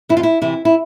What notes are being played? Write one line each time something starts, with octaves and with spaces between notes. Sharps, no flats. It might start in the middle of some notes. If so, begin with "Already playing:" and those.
F2 E4
F4
E4
C3 E3 E4
E4